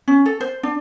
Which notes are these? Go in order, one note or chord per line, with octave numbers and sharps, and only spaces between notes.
C#4
A4
C5
D4